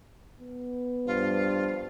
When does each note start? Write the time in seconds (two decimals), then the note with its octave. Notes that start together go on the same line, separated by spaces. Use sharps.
0.41 B3
1.07 G2 F3 F4